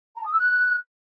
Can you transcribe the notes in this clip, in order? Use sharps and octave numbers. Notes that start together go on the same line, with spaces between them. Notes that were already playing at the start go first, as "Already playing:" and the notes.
A#5
A5
D#6
E6
F#6